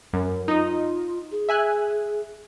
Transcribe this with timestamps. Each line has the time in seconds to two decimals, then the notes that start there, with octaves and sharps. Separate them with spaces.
0.13 F#2 A#4
0.48 D#4 F4 D#5
1.32 G#4
1.49 E5 G#5 F#6